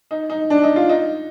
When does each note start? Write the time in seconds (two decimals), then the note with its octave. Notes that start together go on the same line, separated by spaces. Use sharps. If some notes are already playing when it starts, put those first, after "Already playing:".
0.11 D#4
0.30 D#4
0.50 D4
0.64 D#4
0.76 F4
0.89 D#4